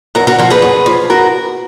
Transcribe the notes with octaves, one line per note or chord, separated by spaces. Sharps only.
F#2 F#4 A#4
F#4 A#4
F3 F#4 A#4
G#4 B4
F#2
F3
F#4 A#4